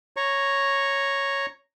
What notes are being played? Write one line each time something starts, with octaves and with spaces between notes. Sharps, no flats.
C#5 A#5 C#6